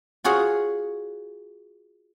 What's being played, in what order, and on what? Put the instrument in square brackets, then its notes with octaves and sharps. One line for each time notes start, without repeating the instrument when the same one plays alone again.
[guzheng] F4 F#4 G#4 C#5 F#5